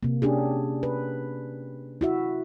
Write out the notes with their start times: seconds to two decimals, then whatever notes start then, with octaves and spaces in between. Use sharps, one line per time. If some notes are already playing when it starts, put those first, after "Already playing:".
0.03 C3 A#3
0.22 C#4 D4 G4 G#4
0.83 B4
2.01 E4 F#4 E5